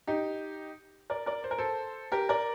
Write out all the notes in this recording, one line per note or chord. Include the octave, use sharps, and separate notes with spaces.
D#4 G4
A#4 D5
A#4 D5
C5
A#4
A4 C5
G4 A#4
A#4 D5